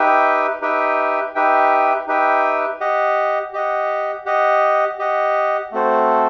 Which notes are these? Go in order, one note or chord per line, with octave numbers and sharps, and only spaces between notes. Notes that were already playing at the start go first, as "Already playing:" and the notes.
Already playing: D#4 G4 B4 E5 G5
D#4 G4 B4 E5 G5
D#4 G4 B4 E5 G5
D#4 G4 B4 E5 G5
G4 D#5 F#5
G4 D#5 F#5
G4 D#5 F#5
G4 D#5 F#5
A3 C4 F#4 A4 C5